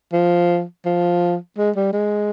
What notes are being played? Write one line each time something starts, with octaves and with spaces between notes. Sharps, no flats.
F3
F3
G#3
G3
G#3